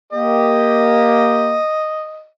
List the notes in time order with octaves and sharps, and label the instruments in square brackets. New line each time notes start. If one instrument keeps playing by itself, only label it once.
[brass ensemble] A#3 G4 [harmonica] D#5